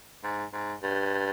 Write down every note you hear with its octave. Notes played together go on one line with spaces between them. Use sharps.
G#2
G#2
G2